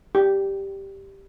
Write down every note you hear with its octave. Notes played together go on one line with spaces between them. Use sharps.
G4